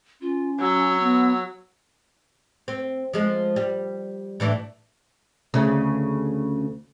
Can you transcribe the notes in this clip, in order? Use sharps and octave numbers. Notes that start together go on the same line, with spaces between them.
C#4 F4
F#3 E6
B3
C4
F3 G#3
G3
A2 E3 D4
D2 C#3